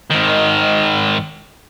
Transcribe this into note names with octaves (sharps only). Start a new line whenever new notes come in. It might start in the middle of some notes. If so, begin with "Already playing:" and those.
G#2 D#3